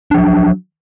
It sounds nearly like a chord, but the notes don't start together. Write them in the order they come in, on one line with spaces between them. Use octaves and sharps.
D4 F3 F#3